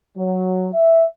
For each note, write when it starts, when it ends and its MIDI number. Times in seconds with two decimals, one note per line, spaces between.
0.17 0.69 54
0.74 1.04 76